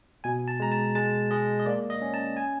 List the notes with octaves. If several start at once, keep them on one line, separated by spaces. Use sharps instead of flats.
B2 G#5
A5
G#3 A#5
A5
G#3 A5
G#3 D#5
D#5
A#3 D5
D#5
C#4
A5
G#5